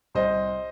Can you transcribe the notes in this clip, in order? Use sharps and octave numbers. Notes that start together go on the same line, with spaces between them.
C2 C5 D#5